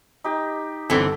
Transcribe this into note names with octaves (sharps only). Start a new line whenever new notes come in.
D#4 G4
G1 D3 E3 C4 A4 B6